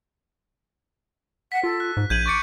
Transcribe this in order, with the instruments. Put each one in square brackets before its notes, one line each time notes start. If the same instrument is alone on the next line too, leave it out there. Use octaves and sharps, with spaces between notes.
[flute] F#5 [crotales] B6
[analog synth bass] F4 [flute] A4
[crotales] F#6
[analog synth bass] G#2
[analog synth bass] A#1 [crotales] G6 D#7 F#7 [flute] G#6
[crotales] C#6 A6 C#7 [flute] D6